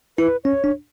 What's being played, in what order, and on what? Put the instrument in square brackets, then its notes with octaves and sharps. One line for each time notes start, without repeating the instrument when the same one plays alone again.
[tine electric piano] E4 [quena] B4
[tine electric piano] C#4 [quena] C#5
[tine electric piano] D4